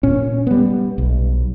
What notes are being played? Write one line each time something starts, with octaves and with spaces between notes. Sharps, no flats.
A#2 C#4
G3 B3
B1